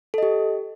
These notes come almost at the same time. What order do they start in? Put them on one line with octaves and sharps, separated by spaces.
A4 D#5 G4